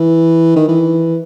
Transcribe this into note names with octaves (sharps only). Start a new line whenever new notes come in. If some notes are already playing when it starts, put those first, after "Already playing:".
Already playing: E3
D#3
E3